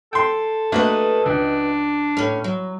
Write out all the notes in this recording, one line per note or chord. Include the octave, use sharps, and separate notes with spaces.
A4 G5 C6
A3 A#3 D4 F#4 B4 D#5
C#2 D4
A2 C#4
F#3